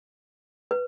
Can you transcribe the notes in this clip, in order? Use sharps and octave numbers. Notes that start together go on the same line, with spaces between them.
B4